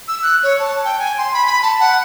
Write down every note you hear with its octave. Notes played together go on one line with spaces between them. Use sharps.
E6
F#6
C#5
A5
G5
G#5
C6
B5
B5
A5
F#5